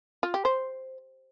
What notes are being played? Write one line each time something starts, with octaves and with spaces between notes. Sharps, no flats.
F4
G4
C5